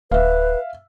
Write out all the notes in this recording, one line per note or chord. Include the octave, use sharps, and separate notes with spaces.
D1 B4 E5 F5